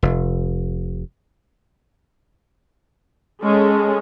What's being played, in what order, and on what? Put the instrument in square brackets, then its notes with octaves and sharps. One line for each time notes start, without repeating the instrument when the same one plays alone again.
[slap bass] F1
[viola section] G#3 C#4 G#4 A4